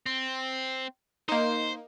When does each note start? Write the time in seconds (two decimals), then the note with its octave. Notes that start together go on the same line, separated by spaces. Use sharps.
0.06 C4
1.29 A#3 D#4 C5